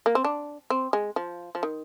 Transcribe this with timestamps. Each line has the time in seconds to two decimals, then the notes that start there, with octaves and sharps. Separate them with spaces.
0.06 A#3
0.15 C4
0.24 D4
0.70 C4
0.93 G#3
1.16 F3
1.55 F3
1.63 D#3